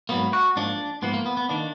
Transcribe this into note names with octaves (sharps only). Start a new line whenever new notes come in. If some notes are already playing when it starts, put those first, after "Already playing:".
G#2 F#3 A#3 B3
F#4
G#2 F3 A#3 D4
G#2 F3 A#3 B3
A#3
B3
B3
D#3 A#3 D4